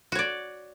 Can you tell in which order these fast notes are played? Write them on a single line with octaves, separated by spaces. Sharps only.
F#4 C#5 D5